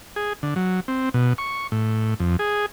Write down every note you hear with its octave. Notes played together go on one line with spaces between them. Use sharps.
G#4
D3
F#3
C4
B2
C#6
A2
F2
G#4